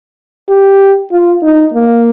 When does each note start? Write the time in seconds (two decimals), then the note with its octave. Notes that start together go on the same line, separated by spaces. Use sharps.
0.49 G4
1.12 F4
1.43 D#4
1.74 A#3